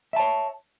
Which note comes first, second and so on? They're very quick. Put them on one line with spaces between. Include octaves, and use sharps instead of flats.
E5 A5 C#5